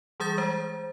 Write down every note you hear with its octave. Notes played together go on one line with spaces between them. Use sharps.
E3 G3 G#4 D#6 G6 A6
G#3 C5